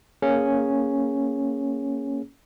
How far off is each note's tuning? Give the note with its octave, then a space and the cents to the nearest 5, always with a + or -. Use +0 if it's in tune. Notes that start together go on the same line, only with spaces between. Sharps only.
A#3 +0 C#4 +0 G#4 +0